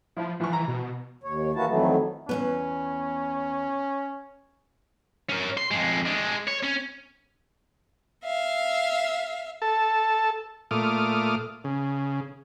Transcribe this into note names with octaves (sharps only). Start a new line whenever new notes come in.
F3 E4
E3 F3 C#6
E3 A#5
B2
D#2 C#5
E2 E3 A#3 E4 F#4 A5
F2 D#3 E3 F#3 A3 B3
E2 G#2 B3 C#4 B4
C#4 A#4
C6
F2 G#3
G#3 D4
C#5
C#4
E5 F5
A4 A5
A#2 A3 D6 D#6 F6
C#3